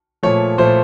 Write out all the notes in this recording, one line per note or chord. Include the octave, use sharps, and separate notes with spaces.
A#2 F3 A3 C#5
A#2 F3 A3 C5